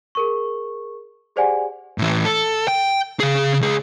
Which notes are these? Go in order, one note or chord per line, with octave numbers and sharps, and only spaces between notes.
G#4 A#4 C#6
G4 G#4 C5 D5 F#5 G#5
A2 E3
A4
G5
C#3 G#4
C#2 G#4